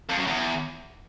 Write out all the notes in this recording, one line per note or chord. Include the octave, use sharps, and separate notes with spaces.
F2
F#2
E2